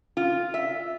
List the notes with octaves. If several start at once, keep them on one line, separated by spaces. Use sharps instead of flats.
F4
E5